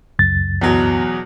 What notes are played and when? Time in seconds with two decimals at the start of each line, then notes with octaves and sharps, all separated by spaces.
0.19 C#2 F#2 A6
0.61 E2 B2 F#3